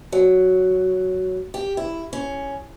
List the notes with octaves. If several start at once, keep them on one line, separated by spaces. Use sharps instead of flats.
F#3
G4
E4
C#4